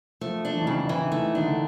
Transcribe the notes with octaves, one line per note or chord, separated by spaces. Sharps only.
F3 A3
D4
E3
D#3
C#3 E3
D#3
E3
D#3 A3
D#3 D4
D3